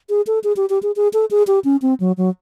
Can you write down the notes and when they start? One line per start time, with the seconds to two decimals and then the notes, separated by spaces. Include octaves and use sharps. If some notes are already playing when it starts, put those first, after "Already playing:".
0.09 G#4
0.27 A4
0.44 G#4
0.57 G4
0.70 G4
0.83 G#4
0.96 G#4
1.13 A4
1.31 G#4
1.47 G4
1.64 C#4
1.82 C4
2.00 F#3
2.18 F#3